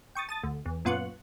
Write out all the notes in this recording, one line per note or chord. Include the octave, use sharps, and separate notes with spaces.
G5 C#6 D#6 A6
A5 D#6 A6
D2
E2
F#2 A#2 B3 F4 C#6 F#6